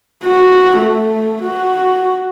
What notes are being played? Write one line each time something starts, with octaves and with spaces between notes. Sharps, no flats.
F#4
A3
F#4